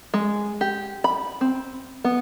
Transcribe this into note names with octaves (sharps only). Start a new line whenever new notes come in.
G#3
G4
B5
C4
B3